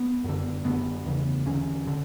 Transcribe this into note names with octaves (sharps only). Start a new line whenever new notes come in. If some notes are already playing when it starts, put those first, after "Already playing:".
Already playing: B3
F#2 D3
F#2 D3 B3
E2 C#3
E2 D3 C#4
D3